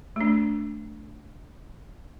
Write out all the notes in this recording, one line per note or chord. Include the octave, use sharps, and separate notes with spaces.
A3 D4